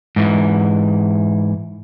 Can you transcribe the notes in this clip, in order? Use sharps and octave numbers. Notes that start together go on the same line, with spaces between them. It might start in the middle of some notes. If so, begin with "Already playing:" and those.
G#2 E3